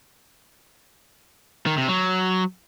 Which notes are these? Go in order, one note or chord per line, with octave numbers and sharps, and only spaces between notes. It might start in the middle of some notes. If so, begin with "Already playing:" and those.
D#3
C3
F#3